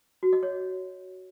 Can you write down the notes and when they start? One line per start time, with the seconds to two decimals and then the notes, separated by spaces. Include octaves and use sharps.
0.23 F#4
0.33 D#5
0.43 C#5